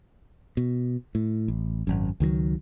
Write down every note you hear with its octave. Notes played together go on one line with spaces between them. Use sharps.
B2
A2
A1
G#1 F#2
C#2 D#3 F3 F#3